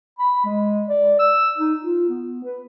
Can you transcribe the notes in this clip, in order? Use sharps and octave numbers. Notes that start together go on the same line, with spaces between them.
B5
G#3
D5
E6
D#4
F4
B3
B4